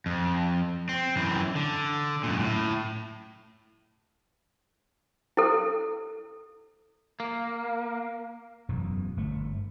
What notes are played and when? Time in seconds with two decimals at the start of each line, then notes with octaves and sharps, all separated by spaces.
0.06 F2
0.89 C4
1.16 F#2 E3
1.56 D3
2.23 F#2 A#2
2.39 A2
5.37 E4 A4
7.20 A#3
8.69 E1 F#2 B2 E3
9.17 G1 A3